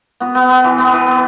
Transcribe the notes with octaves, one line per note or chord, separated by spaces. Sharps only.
B3 F#4
B3
B3
E3
B3
E3
B3